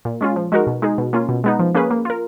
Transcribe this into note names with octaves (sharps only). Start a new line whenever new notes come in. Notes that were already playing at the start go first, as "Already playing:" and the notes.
A#2
G#3 C#4 F4
F3
G#3 D#4 F#4 A#4
B2
G#3 D#4 G#4
B2
A#3 C#4 F4
B2
G#3 B3 D#4
F3
A#3 C#4 G#4 B4
A#3
F4 A#4